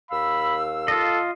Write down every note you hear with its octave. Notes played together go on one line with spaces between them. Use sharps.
D#2 F5 B5 E6
F4 A4 D#5